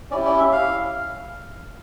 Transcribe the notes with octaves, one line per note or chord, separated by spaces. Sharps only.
C#4 E4 G4 D5
D5
E5
F5